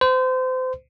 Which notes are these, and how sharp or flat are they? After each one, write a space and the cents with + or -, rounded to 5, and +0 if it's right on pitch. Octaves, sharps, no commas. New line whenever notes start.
C5 -30